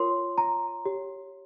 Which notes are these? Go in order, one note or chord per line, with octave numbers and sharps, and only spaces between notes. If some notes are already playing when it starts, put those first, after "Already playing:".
Already playing: F4 A#4 C#5 C6
A#5
G4 C#5